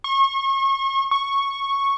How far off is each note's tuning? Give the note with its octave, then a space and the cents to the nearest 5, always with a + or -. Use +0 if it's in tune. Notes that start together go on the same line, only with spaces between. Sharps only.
C#6 -35
C#6 -5